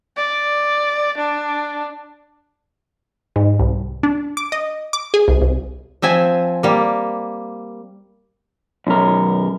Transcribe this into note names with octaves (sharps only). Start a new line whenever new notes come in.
D5
D4
G#2
C2
D4
D6
D#5
D6
G#4
C2
C2
F3 C4 E5 G#5
G3 A#3
B1 F#2 A#4